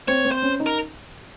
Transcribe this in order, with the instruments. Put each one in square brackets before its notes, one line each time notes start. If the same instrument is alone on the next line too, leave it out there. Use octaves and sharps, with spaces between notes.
[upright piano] C4 [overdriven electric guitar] C#5
[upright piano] C4
[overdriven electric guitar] C5
[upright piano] C#4
D#4
[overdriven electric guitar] A#4